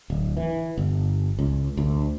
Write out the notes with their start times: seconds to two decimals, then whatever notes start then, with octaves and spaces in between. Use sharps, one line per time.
0.10 D1
0.37 E3
0.78 G1
1.39 C#2
1.77 D2